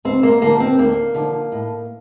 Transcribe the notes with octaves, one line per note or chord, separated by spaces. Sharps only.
D2 C4
A#3
D3 F3 A#3
C4
D2 A#3
D3 F3
A2